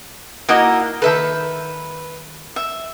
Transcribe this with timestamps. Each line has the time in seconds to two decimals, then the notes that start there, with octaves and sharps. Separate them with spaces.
0.49 A#3 D#4 E4 F#4 A#4 D#5
1.02 D#3 A4 B4 E5 B5
2.56 E5